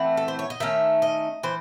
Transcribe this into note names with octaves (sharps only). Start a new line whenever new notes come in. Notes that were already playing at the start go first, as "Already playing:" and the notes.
Already playing: E3 A3 C4 F#5
A4
C5
C#5
D#5
D#3 A3 C#4 E5
D#5
E3 C5